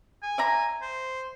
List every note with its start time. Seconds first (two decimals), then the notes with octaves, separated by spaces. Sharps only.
0.23 G#5
0.38 D5 E5 A#5
0.82 C5